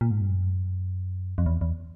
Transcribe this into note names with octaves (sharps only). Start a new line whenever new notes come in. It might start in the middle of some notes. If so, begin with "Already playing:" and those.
A#2
G#2
G2
F#2
F2
E2
E2